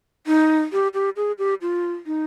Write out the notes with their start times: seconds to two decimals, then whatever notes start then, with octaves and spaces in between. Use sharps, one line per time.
0.27 D#4
0.72 G4
0.94 G4
1.16 G#4
1.39 G4
1.62 F4
2.06 D#4